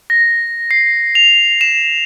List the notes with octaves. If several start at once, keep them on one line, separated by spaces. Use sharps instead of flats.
A#6
C7
F7
E7